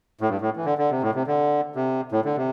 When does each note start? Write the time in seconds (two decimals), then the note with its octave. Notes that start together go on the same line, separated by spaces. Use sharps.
0.21 A2
0.29 G2
0.41 A2
0.56 E3
0.65 D3
0.78 D3
0.90 C3
1.02 A2
1.15 C3
1.27 D3
1.75 C3
2.12 A2
2.25 D3
2.37 C3